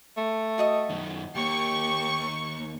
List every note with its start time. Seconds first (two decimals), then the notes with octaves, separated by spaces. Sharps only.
0.17 A3
0.58 F#4 D#5 D#6
0.90 F#2 D#3
1.35 D#2 A#3 G4 C#6